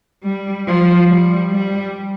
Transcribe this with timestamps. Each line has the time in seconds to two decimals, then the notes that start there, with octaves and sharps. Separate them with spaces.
0.24 G3
0.67 F3
1.08 G3
1.51 G3